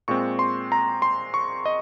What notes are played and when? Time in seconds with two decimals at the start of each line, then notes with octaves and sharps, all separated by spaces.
0.08 A#2 G#3 C4 C#6
0.39 C6
0.72 A#5
1.02 C6
1.34 C#6
1.65 D#5